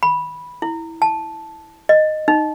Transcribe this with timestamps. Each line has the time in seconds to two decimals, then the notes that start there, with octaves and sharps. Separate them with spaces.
0.03 B5
0.62 E4
1.02 A5
1.89 D#5
2.28 D#4